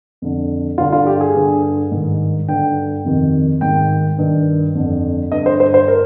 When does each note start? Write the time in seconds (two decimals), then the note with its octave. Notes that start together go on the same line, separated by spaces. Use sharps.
0.22 F2 D3
0.78 G2 F4
0.80 D3
0.92 F4
1.07 G4
1.21 G#4
1.35 G2 D3
1.92 G#2 D#3
2.48 G2 D3 G5
3.05 F2 C3 D#3
3.61 G#2 D#3 G5
4.18 G2 D#3
4.75 F2 D3
5.32 G2 D3 D#5
5.46 C5
5.60 C5
5.74 C5
5.88 A#4